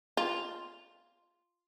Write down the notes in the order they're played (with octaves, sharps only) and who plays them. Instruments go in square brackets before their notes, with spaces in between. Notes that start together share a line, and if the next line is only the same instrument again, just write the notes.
[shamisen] F4